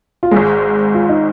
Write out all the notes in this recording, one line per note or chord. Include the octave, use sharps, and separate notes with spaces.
F4
G#1 G#2 G#3 G#4
F4
D#4